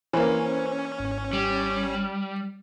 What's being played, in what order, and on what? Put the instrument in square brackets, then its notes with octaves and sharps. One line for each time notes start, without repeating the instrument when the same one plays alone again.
[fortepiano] E3 A#3 [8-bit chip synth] C#4 [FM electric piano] B4 C5 G#5
[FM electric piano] G#1
[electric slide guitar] G3